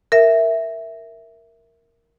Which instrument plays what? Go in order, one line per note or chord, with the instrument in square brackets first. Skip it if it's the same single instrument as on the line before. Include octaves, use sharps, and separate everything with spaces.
[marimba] A#4 E5